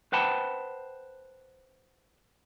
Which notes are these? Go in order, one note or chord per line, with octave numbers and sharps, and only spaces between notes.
B4 C5 F#5 G5 A5 B5